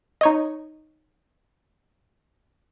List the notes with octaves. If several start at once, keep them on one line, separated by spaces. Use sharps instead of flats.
D#4 C#5 D#5